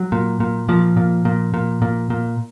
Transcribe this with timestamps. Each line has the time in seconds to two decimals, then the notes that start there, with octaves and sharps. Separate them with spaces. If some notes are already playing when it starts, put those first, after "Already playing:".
Already playing: F#3
0.12 A#2
0.40 A#2
0.69 A#2 F3
0.97 A#2
1.25 A#2
1.54 A#2
1.82 A#2
2.10 A#2